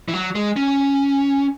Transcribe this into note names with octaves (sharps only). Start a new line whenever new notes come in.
E3
F#3
G#3
C#4